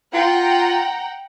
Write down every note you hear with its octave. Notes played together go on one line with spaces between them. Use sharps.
F4 F#5 G5 A#5